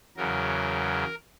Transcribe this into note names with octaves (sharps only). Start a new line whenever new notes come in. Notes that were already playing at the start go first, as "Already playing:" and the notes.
E2 C#3 F#3 A#4